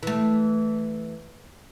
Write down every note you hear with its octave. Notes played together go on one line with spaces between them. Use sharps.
E3 A3